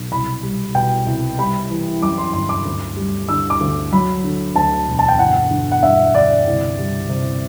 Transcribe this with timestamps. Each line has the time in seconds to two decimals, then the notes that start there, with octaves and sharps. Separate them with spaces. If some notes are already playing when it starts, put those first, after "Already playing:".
Already playing: B1
0.12 C2 B5
0.43 G3
0.75 B2 G5
1.06 C2
1.38 G3 B5
1.70 E3
2.02 F#2 D6
2.18 C6
2.33 G1 C6
2.49 D6
2.66 D2
2.97 G3
3.29 D3 E6
3.50 D6
3.61 D2
3.92 F#3 B5
4.24 D3
4.55 D2 A5
4.88 E1
4.99 A5
5.08 G5
5.19 G1 F#5
5.51 D3
5.72 F#5
5.83 G2 E5
6.15 G1 D5
6.46 C2
6.78 G3
7.09 C3